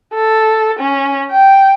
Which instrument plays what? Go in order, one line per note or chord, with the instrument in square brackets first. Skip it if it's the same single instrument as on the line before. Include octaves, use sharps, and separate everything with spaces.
[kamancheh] A4
C#4
G5